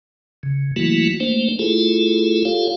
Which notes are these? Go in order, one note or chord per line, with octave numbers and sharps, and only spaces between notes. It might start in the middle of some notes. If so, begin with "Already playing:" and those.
C#3
E3 F#3 A3 A#3 E4 F#4
A3 A#3 D4 C5
A3 E4 F4 G#4 A4
F4 G4 A4 C#5 F5